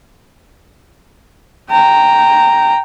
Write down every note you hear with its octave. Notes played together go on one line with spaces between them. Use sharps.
G5 A#5